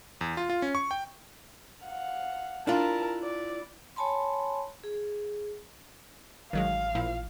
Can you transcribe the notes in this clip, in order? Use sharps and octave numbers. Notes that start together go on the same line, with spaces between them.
E2
F4
F4
C#4
C#6
G5
F5 F#5
D4 E4 F4 A#4 A5
D5
C#5 G#5 A5 B5 C6
G#4
A1 D#3 F#3 G#3 F5
A#2 F3 E4